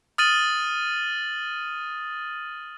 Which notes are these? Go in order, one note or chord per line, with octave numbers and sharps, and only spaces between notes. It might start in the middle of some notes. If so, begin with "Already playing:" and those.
D#6 F6 A6 D#7 F#7